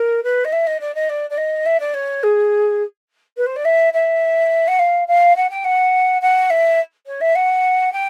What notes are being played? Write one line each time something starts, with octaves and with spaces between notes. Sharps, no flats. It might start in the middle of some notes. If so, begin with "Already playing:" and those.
Already playing: A#4
B4
D#5
E5
D#5
D5
D#5
D5
D5
D#5
E5
D5
C#5
G#4
B4
C5
D5
E5
E5
F#5
F5
F5
F#5
G5
F#5
F#5
E5
C#5
E5
F#5
G5